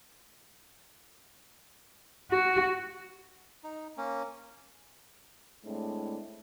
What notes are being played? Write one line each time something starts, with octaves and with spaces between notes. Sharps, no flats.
F#4
D#4
A#3 C#4
A2 G#3 C4 D4